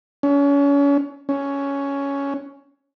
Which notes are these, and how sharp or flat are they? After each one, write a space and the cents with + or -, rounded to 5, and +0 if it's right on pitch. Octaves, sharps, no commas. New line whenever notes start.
C#4 +35
C#4 +10